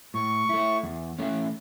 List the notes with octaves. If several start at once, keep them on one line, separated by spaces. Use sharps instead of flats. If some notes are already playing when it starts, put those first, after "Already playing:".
A2 C#6
A3 E4
E2
E3 A3 C#4